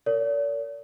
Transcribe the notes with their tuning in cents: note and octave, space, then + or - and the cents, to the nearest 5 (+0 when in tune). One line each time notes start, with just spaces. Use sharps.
A#4 -30 D5 -45